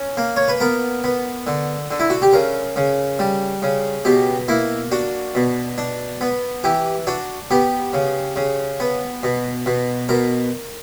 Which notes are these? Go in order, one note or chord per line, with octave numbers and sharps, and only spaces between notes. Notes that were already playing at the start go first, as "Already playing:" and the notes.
Already playing: C#4
A#3
C#5
B4
B3 A#4
B3
D3
D3
E4
F#4
G4
C#3 A#4
C#3
G3
C#3
B2 G4
A#3 E4
D4 F#4
B2
D4
B3
E3 G4
D4 F#4
B3 G4
C#3
C#3
B3
B2
B2
B2 A#4